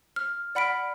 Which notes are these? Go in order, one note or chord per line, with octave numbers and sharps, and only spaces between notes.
F6
D5 F#5 B5 F6 B6 D7